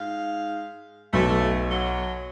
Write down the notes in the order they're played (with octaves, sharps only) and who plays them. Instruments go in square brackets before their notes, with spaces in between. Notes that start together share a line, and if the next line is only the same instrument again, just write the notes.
[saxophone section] G#2 F5
[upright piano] B1 [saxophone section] A3
[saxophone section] F#3